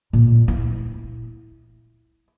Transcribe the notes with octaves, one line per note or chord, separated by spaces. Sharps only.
A#2
E4